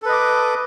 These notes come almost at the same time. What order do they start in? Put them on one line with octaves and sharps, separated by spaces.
A4 B4 D#5 D6